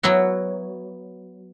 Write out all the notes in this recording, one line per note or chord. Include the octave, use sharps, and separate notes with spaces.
F#3 B3 E4 F#4